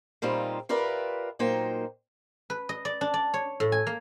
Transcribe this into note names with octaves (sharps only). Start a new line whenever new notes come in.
A#2 G3 C4 D#4 F4
F4 G4 A#4 B4 D5 E5
A#2 F#3 A#3 D#4 C5 G5
B4
D#5
D5
D4
D5
C#5
A2
G#5
A#3